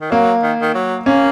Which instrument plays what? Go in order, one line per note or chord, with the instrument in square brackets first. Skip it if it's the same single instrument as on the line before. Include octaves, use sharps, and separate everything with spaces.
[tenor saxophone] D#3
[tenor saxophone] F#3 [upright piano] A#3
[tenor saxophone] D#3
D#3
F#3
[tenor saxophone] A#3 [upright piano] C#4